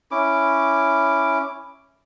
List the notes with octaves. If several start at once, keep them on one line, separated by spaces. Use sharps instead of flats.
C#4 E4 D6